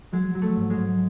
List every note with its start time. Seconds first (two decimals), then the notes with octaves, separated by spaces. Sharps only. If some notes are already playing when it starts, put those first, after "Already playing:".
0.12 F#3 G#3
0.35 F#3
0.42 A3
0.56 G#2
0.70 G#3
0.77 G#2